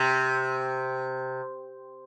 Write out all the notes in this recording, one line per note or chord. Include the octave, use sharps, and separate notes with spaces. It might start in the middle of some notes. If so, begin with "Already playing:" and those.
Already playing: C3